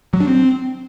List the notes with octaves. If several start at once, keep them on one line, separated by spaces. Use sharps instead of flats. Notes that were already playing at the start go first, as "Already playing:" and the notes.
F#3
D4
C4